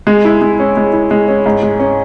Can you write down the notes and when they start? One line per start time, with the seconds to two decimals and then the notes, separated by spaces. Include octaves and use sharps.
0.07 G#3
0.25 E4
0.41 G#3
0.60 C#4
0.77 G#3
0.93 E4
1.11 G#3
1.28 C#4
1.46 G#2
1.63 G#3
1.80 C#4